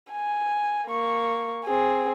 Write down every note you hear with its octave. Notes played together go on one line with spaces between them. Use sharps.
G#5
A#3 C#6
C4 G#4